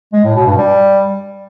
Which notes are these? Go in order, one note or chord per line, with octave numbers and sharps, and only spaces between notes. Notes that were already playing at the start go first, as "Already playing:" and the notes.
G#3
A2
B2
G2
G3